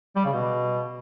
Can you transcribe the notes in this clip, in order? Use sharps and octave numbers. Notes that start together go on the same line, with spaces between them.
G3
C#3
B2